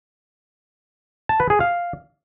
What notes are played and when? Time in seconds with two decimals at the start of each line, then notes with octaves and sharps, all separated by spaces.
1.29 A5
1.40 B4
1.50 G#4
1.60 F5